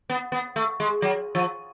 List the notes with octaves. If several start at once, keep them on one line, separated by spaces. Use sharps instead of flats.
B3
B3
A3
G#3
F#3
F3